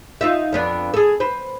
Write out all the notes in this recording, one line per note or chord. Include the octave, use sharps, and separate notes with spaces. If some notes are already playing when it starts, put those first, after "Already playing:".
D#4 F4 E5
F2 B3 D4
G#4 A4
B4 C5